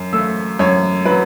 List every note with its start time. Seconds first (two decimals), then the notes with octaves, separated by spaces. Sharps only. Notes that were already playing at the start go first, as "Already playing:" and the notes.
Already playing: F#2
0.13 A3 E6
0.59 F#2 C#5
1.05 F#3 B4